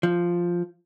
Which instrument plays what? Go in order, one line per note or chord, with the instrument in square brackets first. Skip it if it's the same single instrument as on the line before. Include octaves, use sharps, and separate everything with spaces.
[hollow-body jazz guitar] F3